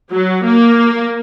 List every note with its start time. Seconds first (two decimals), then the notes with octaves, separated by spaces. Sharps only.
0.12 F#3
0.44 A#3